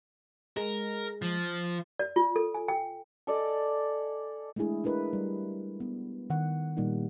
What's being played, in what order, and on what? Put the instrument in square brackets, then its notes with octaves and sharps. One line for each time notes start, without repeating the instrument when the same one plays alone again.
[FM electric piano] G#3 [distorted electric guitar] A#4
[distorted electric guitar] F3
[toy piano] D5
F4
A4
G#5
G5
[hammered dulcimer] A4 D5 D#5 G#5
[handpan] G#3 A3 D4 E4 G#4
D4 E4 A#4 B4 D#5
G3
B3
D#3 F#5
A#2 G3 A#3 D#4